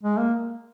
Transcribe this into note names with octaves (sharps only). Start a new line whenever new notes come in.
G#3
A#3